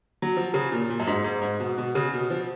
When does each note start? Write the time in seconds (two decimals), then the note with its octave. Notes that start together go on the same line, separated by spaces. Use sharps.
0.22 F#3
0.37 F3
0.54 C#3
0.72 A#2
0.89 A#2
1.00 F#2
1.07 G#2
1.24 G#2
1.42 G#2
1.60 B2
1.78 B2
1.95 C#3
2.13 B2
2.30 F3